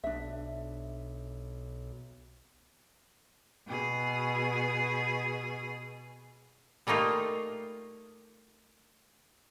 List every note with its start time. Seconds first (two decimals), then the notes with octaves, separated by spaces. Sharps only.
0.04 B1 D4 E5
3.67 B2 G#4
6.87 G3 A3 A#3 D#4 F4